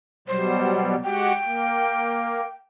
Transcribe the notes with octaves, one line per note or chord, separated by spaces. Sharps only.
B2 F#3 G3 C5
G#3 F#4 G4 G5
A#3